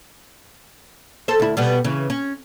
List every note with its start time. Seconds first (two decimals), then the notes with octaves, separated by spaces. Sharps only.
1.28 A4 C5
1.40 D2 E4
1.57 B2 G3 B3
1.84 C#3 E3
2.10 C#4